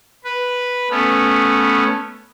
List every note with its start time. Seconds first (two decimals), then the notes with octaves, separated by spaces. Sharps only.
0.24 B4
0.90 A3 B3 C#4